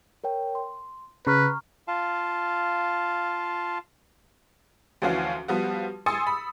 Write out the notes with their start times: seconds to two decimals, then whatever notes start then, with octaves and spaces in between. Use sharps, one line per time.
0.24 A#4 C#5 G5
0.55 C6
1.27 C#3 B4 A#5 C#6 F6
1.88 F4 F5 A5
5.02 D2 E3 F3 C#4 F#4 F5
5.48 F3 G3 B3 F#4
6.06 G#5 C6 D#6 E6 A6 C#7
6.27 B5